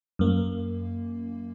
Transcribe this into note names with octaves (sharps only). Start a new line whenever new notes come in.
F#2 A#3